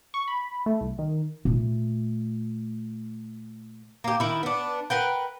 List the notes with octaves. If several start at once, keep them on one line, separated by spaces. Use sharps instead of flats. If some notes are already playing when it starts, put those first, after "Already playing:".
C#6
B5
A3
C2
D#3
A#2 A3
A#3 G4
D#3 E4
B3 D4
A#4 B4 F#5 G5